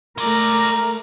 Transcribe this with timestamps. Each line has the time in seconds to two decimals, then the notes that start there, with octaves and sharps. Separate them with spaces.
0.18 G#3 A3 A#4 D5 A#5